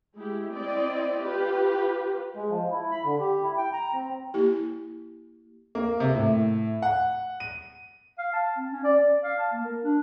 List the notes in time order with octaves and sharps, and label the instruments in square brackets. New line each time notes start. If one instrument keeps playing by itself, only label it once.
[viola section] G#3 E4 G4
C4 E4 D5 D#5
F4 G4 B4
[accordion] G#3
F3
E4
B5
D3
G4
E4
G5
A#5
C4
[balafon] A#3 E4 G4
[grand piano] A#3
C3
A2
F#5
D#7
[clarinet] F5
A5
C4
C#4
D5
D5
F5
A5
A#3
A#4
D4